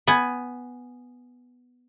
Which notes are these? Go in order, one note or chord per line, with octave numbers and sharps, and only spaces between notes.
B3 G#5